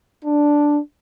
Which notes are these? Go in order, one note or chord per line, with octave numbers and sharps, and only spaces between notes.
D4